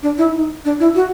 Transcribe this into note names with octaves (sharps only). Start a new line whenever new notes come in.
D4
E4
D#4
D4
E4
F#4